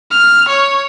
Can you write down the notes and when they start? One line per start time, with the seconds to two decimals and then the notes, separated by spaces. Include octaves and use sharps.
0.11 F6
0.49 C#5